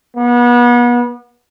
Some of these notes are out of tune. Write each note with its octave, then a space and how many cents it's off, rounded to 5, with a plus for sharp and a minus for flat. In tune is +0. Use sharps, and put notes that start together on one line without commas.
B3 -35